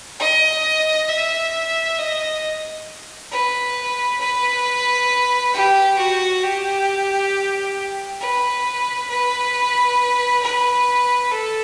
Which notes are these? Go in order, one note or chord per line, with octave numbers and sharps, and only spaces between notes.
D#5
E5
D#5
B4
B4
G4
F#4
G4
B4
B4
B4
A4